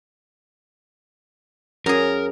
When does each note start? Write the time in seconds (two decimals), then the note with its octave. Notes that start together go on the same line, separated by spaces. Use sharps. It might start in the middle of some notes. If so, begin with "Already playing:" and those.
1.86 F#2 G#4 A#4